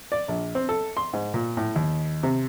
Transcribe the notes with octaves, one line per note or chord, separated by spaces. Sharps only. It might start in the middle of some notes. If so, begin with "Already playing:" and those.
D5
A#1
C4
A4
C6
G#2
A#2
A2
D#2
C3